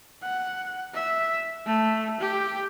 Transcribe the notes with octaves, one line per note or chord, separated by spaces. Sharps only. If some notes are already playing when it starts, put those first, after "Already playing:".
F#5
E5
A3
G4